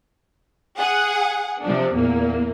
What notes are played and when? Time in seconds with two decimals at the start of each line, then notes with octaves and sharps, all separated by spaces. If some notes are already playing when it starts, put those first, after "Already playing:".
0.79 G#4 F#5
1.63 C3 F3 D4
1.96 E2 A#2 A#3